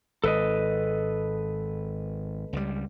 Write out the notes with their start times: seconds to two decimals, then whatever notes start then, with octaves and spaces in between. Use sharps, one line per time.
0.24 G#1 A4 B4 D#5
2.53 C#2 G3